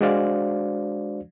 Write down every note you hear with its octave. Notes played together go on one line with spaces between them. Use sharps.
G#3 D4 F#4 C5 D5 F5